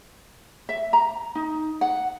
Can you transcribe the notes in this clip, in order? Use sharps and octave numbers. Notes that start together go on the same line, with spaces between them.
E5
A#5
D#4
F#5